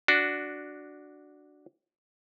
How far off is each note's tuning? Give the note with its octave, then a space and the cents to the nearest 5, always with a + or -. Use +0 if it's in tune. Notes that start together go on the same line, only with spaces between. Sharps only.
D4 +0 F#4 +0